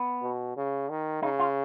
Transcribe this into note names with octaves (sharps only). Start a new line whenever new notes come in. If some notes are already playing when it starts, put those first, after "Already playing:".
Already playing: B3
B2
C#3
D#3
C#3 D#4
F4